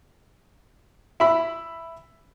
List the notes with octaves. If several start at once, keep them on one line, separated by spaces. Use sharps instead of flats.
E4 B5